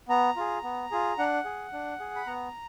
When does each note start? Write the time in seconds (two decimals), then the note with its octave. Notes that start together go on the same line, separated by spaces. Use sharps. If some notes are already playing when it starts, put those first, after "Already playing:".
0.09 B3 A#5
0.36 F4 G#4
0.63 B3
0.91 F4 G#4
1.18 D4 F#5
1.45 G#4
1.73 D4
2.00 G#4
2.16 B5
2.26 B3 A#5